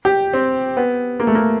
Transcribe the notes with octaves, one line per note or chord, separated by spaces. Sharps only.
G4
C4
B3
A#3
A3
A#3